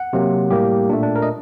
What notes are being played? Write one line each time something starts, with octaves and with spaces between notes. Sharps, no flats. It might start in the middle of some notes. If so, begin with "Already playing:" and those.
Already playing: F#5
C3 F#3 A#3
A2 G3 A#3 G4
A#2 A3 D4
D4
A#4
D#5